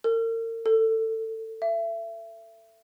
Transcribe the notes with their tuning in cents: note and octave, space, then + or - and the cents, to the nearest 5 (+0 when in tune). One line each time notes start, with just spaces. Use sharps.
A#4 -40
A4 +20
E5 +30